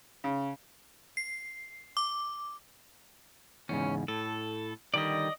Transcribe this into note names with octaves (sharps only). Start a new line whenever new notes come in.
C#3
C7
D6
E2 G#2 C#3 C#4
A2 A4
D3 D#3 G3 D5 D#5